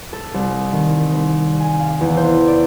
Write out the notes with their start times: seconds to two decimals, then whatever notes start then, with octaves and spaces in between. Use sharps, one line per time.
0.13 A4
0.34 C2
0.72 D#3
1.14 C2
1.60 G#5
1.79 F5
2.01 E2
2.17 C5
2.48 D5